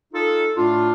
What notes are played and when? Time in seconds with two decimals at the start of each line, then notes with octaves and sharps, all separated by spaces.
0.13 D#4 F4 A4
0.57 A2 A3 D4 F4